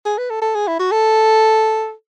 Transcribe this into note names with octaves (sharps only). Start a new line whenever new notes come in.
G#4
B4
A4
A4
G#4
E4
F#4
A4